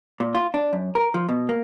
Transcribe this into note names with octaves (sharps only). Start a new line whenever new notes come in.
A#2
F4
D4
F#2
A#4
F3
B2
A#3